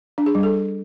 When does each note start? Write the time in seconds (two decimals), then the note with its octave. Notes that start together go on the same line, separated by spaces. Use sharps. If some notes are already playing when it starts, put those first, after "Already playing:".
0.18 D4
0.26 G#4
0.35 G3
0.43 A4